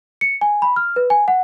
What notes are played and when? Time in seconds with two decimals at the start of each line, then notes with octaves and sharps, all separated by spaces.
0.21 C#7
0.41 G#5
0.62 B5
0.76 F6
0.96 B4
1.10 G#5
1.28 F#5